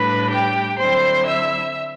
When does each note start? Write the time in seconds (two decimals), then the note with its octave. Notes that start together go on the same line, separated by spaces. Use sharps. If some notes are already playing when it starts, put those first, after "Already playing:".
Already playing: A2 G3 D4 B4 B5
0.31 G4 G5
0.78 D3 F#3 C4 E4 C5 C6
1.26 E5 E6